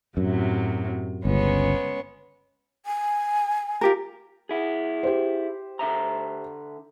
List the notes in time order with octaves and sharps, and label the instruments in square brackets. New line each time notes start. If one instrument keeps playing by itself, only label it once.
[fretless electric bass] F#2 [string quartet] A2 C3 F#3
[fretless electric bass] G1 C#2 [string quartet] G#3 B3 C#4
[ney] G#5
[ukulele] F4 G4 A#4
[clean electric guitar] E4 G#4
[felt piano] G4 C5
[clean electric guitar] D3 E5 A#5